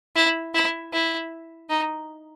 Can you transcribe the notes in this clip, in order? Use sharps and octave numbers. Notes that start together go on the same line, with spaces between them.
E4
E4
E4
D#4